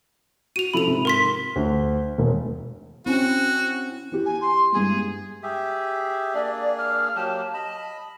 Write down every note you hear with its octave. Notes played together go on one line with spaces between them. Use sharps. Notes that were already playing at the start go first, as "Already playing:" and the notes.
F#4 D#7 F7
C3 F3 A4 B5 F7
G#2 C3
A#4 C6 B6
D2
E1
C4 C#4 E4 F#4
E3 G4
G#5
C6
G2 G#3 G#4
G4 G#4 E5
A#3 D4 G#4 D5
F6
F#3 A#3 G4 A5
D#5 B5